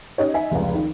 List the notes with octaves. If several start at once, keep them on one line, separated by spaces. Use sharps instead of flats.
C#4 D#4 G4 C#5
D#4 E5 G#5
F1 C#2
D#3